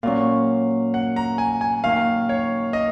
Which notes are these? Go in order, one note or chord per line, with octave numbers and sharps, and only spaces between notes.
A#2 F#3 C#4 F5
F#5
A#5
G#5
G#5
F#2 D#3 A#3 F5
C#5
D#5